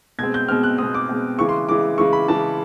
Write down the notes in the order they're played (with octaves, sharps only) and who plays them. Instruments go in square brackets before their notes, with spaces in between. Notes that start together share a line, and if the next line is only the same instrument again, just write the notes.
[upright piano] B2 G#6
G#3 C4
G6
B2 G#3 C4 F6
F#6
B2 G#3 C4 D#6
D6
B2 G#3 C4
C#3 E3 G#3 C#6
C6
C#3 E3 G#3 D6
C#3 E3 G#3 C#6
B5
C#3 E3 G#3 A5